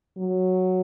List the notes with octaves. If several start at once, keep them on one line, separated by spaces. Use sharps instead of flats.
F#3